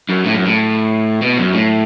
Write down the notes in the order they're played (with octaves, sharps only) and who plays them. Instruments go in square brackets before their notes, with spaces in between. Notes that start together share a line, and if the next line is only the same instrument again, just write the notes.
[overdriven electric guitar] F#2
A2
F#2
A2
B2
F#2
A2